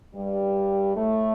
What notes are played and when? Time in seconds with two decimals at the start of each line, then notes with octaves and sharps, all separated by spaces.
0.14 G2 G3
0.96 A2 A3